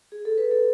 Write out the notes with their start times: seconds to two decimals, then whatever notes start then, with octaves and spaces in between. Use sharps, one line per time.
0.12 G#4
0.25 A4
0.38 B4
0.51 A4